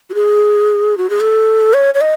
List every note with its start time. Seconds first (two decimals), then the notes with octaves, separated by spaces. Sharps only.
0.10 F#4
0.14 G#4
0.97 F#4
1.10 G#4
1.20 A4
1.73 C#5
1.94 C#5
2.01 D#5